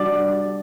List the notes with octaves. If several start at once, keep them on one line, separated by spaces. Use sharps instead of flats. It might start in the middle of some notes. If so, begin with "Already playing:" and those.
Already playing: G3 D4 F#4 D5